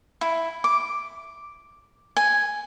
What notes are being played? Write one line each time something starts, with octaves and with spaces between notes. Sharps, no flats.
E4
D6
G#5